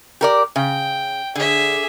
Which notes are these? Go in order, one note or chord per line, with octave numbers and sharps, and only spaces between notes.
G4 A#4 D5
C#3 G5
D3 G#4 E5